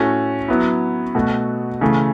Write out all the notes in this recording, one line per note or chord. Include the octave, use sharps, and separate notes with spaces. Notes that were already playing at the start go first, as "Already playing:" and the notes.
Already playing: A2 A3 C#4 F#4
F#3 B3 E4
B2 A3 F#4
C#3 E3 A3